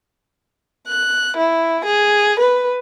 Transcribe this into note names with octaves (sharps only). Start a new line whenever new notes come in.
F#6
E4
G#4
B4